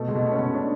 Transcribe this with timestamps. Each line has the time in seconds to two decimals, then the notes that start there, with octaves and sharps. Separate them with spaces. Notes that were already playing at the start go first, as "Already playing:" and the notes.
Already playing: B2 A3
0.08 G#3
0.15 B2
0.23 A3
0.32 C#4
0.38 B2 B3
0.54 D4